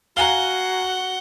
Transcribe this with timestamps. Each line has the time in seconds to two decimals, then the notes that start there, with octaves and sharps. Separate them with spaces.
0.17 F#4 F5 F#5 G#5 A#5 G7